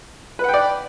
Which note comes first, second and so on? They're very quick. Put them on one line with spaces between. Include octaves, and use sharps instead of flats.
B4 F#5 G5 D5